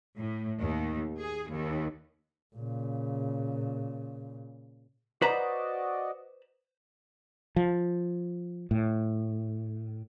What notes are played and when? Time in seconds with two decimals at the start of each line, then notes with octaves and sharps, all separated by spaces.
0.16 A2
0.61 D#2
1.20 G#4
1.51 D#2
2.56 A#2 C#3
5.22 F#4 B4 C5 D5 D#5 A#5
7.56 F3
8.71 A2